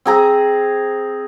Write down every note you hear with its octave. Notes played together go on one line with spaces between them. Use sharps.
C4 G#4 A#5